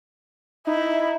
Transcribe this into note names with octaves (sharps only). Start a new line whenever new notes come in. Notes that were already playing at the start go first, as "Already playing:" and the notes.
D#4 E4